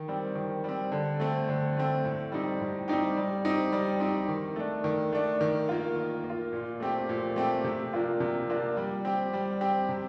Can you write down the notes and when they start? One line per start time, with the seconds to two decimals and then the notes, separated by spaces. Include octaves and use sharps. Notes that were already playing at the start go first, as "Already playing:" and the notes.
Already playing: D#3
0.08 G3 C4
0.35 D#3
0.64 G3 C4
0.92 D3
1.20 A3 C4
1.49 D3
1.77 A3 C4
2.05 A2
2.32 G3 C4 D#4 G4
2.61 A2
2.88 G3 C4 D#4 G4
3.17 G3
3.45 C4 D#4 G4
3.72 G3
4.00 C4 D#4 G4
4.28 D#3
4.56 A3 D4
4.84 D#3
5.13 A3 D4
5.41 D#3
5.69 A#3 F4
5.96 D#3
6.24 A#3
6.30 F4
6.53 A#2
6.80 A3 C4 G4
7.09 A#2
7.36 A3 C4 G4
7.64 C3
7.93 F3 A#3 D4 F4
8.20 C3
8.48 F3 A#3 D4 F4
8.77 G3
9.05 C4 G4
9.33 G3
9.61 C4 G4
9.89 C3